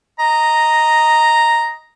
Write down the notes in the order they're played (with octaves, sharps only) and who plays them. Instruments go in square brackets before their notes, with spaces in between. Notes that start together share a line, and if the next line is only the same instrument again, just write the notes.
[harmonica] D#5 A#5